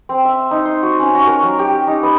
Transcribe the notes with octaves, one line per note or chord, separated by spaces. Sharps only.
C4
E5
D#4
C6
F#4
C#4
F#4
A#4
F#3
G4
D#4
B3